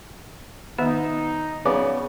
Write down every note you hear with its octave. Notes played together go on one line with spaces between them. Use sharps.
D#3 B3 D#4 E5
C#3 F#3 B3 D5